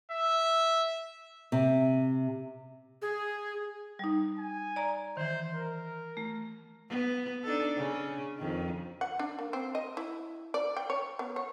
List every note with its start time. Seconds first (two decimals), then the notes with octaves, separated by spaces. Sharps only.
0.12 E5
1.52 C3
3.02 G#4
3.99 G3 D#4
4.39 G#5
4.76 D5 A#5
5.17 D#3 E3 C5
5.54 A#4
6.17 A3
6.89 B3
7.44 D4 D#4 A4
7.76 C#3 C#4
8.39 F2 D#3
9.01 F#5
9.19 D4
9.39 A#3
9.53 C4
9.75 D#5
9.97 E4
10.54 D5
10.77 G5
10.90 C#5
11.19 B3
11.36 C#5